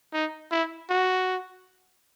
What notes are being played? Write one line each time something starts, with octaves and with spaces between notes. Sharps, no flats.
D#4
E4
F#4